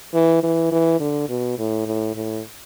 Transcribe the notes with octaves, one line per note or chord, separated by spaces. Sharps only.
E3
E3
E3
D3
B2
A2
A2
A2